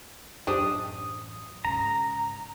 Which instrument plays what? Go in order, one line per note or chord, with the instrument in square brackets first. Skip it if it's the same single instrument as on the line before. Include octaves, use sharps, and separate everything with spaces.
[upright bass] A1 F#2 [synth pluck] D4 G4 C5 [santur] D#6
[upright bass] G#2 C#3 [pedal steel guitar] A#5